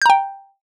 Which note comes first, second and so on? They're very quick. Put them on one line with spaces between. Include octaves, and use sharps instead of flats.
G6 A#5 G5